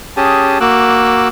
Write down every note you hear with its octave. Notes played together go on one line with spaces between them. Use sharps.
C#4 G4 G#4 A5 D#6
A#3 F#4 D6 E6 F#6